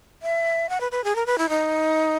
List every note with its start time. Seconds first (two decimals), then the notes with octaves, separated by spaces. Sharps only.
0.22 E5
0.69 F#5
0.80 B4
0.92 B4
1.04 G#4
1.15 A#4
1.26 B4
1.38 E4
1.49 D#4